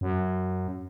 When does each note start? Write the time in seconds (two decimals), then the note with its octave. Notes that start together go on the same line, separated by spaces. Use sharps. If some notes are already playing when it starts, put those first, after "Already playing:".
0.01 F#2